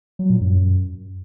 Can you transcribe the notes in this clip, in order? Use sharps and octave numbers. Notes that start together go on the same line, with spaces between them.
F#3
A#2
F#2